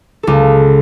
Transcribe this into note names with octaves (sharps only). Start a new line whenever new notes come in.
C#2 A4